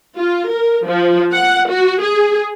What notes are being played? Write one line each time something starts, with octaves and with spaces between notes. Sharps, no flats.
F4
A#4
F3
F#5
F#4
G#4